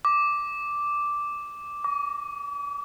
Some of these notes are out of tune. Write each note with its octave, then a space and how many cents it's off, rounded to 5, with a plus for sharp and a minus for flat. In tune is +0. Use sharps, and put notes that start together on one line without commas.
D6 -5
D6 -45